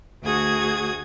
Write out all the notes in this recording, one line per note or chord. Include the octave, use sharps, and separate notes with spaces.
D2 F#4 G#4 D#6 G#6